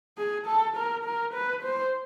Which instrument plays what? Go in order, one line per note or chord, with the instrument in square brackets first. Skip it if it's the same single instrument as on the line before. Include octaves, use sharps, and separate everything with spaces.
[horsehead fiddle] G#4
A4
A#4
A#4
B4
C5